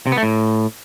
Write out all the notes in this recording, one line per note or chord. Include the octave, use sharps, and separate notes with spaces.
C3
B3
A3
A2